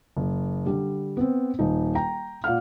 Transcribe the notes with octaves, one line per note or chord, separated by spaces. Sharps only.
F#1
D3 G3
B3 C4
D#1 D#4
G5 A#5
A#2 F5 F#5 F6